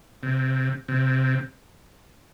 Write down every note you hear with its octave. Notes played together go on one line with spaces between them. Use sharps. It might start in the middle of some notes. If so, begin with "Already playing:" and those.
C3
C3